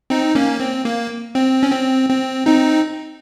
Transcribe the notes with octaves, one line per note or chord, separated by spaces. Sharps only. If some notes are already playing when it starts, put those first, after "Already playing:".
C4 D#4
A#3 C#4
C4
A#3
C4
C#4
C4
C4
C4 D#4